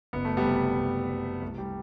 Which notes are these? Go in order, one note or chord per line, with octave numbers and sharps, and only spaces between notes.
F#1 B3
A3
G3 B3
C3
F#1
C3
C2 A3
G3